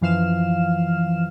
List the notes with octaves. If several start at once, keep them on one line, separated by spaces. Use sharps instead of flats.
F#2 E3 F3 F5 F6 E7